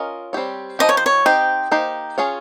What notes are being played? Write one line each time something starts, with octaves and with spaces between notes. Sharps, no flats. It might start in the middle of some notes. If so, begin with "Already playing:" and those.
Already playing: C#4 F4 A#4 D#5
G3 C4 G4 C#5
F3 G#3 D#4 G4 D#5
C#5
C5
C#5
C4 D#4 G4 C5 D#5 G5
A#3 D#4 G4 C5
C#4 F4 G#4 C#5